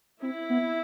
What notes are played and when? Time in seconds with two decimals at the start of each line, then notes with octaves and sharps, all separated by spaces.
0.22 C4 E4
0.50 B3